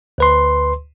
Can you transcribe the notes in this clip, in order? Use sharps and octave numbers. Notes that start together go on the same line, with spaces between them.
D2 B4 C6